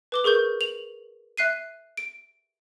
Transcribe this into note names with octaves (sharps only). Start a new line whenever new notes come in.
B4 D6 G7
G#4 A#4 C#6 G6
F7 F#7
E5 F#6 C7 D#7
D7